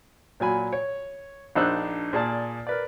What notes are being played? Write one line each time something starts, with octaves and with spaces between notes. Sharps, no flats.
A#2 F#3 G#5 B5
C#5
A#1 D4 D#4 C5 E6 F#6
A#2 G#4 D5 A5
A#4 B4 D5